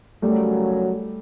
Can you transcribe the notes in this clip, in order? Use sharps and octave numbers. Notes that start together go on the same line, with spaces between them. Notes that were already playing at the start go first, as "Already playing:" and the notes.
F#2 C#3 F#3 G3 A3